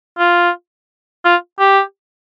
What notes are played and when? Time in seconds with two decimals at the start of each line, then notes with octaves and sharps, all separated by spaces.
0.19 F4
1.25 F4
1.60 G4